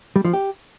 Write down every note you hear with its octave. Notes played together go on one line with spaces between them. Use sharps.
G3
F3
G4